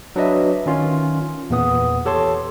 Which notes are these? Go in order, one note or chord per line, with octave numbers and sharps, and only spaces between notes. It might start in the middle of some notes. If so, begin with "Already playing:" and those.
F#3 D4 B4 D#5 E5
D#3 C#4 F4
E2 A#2 B3 D#6
G4 A4 C#5 A5 C6